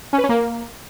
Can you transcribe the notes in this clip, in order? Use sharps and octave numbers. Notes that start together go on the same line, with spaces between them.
C#4
B4
C#4
A#3